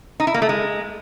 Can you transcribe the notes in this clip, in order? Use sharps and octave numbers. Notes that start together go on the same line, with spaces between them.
D#4
E4
A#3
A3
G#3